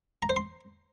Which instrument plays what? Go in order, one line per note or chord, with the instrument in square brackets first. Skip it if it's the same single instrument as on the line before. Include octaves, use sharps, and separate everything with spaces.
[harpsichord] A#5
C5
C6